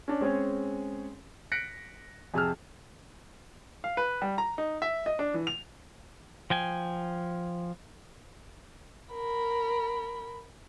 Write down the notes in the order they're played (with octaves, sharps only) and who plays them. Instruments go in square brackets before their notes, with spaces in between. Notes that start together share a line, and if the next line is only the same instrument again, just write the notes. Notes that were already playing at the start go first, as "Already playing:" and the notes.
[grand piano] C#4 D4
G#3 C4 C#4 G#4 C#5
F#6 A#6 B6 C#7 D7
F2 C3 G#4 A5 E6 F6
[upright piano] F5
B4
G3
A#5
D#4
E5
D#5
D4
E3
F7
[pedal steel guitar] F3 G5 G#5
[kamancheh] A#4 B5